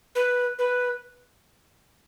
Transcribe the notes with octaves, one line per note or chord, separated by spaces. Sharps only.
B4
B4